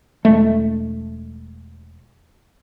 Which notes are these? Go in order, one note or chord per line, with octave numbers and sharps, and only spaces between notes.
E1 D#2 G#3 A3